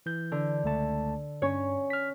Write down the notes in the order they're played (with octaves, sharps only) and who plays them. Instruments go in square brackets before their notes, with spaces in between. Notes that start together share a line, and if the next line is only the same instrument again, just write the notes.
[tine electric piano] E3 G6
[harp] D3
[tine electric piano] C#2 A3 A5
[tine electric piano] G2 [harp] C#4 C#5
[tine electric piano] F6 B6